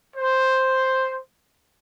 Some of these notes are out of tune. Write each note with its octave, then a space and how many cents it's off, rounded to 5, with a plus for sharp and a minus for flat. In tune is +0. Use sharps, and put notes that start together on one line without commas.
C5 +5